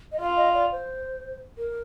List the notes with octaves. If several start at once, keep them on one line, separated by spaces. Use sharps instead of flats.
D#5
F4 F5
D#5
D5
C5
A#4